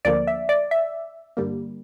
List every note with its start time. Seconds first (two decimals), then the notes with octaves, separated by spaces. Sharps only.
0.05 D2 D3 F3 A#3 D5
0.27 E5
0.49 D5
0.71 E5
1.37 G2 D3 G3 A#3